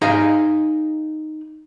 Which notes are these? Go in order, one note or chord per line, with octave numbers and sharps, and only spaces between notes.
D#4 G#4 D#5 F5